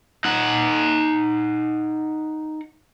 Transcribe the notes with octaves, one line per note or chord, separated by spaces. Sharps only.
D#4 F#5